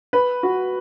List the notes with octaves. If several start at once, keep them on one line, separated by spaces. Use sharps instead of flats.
B4
F#4